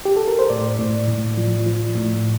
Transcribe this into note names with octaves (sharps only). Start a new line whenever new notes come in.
G4
A4
A#4
C5
A2 D5
A2
A2
F3
F3
A2